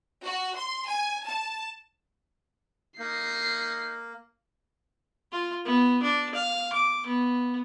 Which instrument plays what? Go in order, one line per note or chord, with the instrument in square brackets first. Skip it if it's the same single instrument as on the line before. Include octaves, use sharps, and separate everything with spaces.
[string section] F#4
C6
G#5
A5
[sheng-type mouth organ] A#3 [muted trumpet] D#4 [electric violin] C7
[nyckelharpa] F4
B3
D4
F5
D6
B3